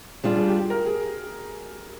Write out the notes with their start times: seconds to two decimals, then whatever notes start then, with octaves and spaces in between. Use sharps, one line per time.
0.23 G3 D4 F4 G#4
0.35 G#4
0.48 G4
0.58 G4
0.70 A#4
0.85 G#4